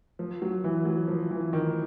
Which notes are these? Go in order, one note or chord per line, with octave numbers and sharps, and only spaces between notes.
F3
F#3
E3
F#3
F3
E3
D#3